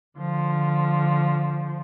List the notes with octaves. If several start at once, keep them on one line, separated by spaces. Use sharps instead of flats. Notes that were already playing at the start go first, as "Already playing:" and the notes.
D3 F3